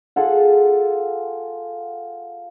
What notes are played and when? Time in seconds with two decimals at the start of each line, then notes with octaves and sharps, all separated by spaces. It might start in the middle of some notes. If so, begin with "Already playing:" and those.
0.16 F4 G#4 A4 F#5